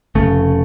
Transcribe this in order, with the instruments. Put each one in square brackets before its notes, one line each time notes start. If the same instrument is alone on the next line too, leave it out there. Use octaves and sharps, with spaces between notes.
[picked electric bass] F1 E2 C#3 A3